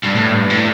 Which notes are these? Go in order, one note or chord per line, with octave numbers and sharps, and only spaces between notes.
G2
A2
G2
A2